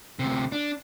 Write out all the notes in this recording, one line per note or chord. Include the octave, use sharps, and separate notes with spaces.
D2 C3
D4